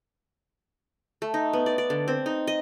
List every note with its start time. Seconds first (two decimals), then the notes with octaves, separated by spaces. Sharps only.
1.22 A3
1.34 D#4
1.53 B3
1.66 D5
1.78 D5
1.90 D3
2.08 C4
2.26 D#4
2.47 D#5